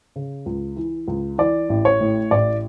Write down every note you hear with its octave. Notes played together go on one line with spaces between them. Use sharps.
C#3
C#2
E3
C#2
E3 D5
A1
C#5
A2
A1 D5